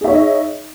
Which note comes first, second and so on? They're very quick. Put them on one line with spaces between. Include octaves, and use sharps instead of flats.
G#4 E5 C#5 D#4 D#5